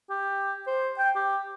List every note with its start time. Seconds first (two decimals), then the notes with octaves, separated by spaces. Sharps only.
0.10 G4
0.67 C5
0.98 G5
1.16 G4